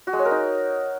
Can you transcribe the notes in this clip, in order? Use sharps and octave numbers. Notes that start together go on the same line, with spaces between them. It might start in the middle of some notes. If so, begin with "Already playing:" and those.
F#4
G#3
C#5
A#4
D#4